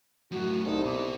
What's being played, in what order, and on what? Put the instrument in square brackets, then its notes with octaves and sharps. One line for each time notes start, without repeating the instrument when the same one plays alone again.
[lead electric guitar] F#2 A2 [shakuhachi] F#4
[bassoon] C2 [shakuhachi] D#4 [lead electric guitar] A4
[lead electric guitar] B2 [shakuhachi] D6